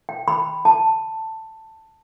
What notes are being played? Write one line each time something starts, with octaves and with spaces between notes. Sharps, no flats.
G5
B5
A5